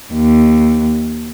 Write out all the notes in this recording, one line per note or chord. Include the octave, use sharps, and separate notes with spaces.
D#2